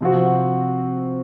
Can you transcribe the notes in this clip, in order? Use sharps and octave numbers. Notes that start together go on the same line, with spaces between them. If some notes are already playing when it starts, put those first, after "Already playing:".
C3 F3 C4 F#4